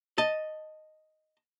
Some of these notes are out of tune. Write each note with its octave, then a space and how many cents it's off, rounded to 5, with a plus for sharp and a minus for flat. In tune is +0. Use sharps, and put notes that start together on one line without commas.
D#5 +0 A5 +5